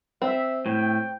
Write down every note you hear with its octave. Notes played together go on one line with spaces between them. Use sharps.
C4 E5
A2 G5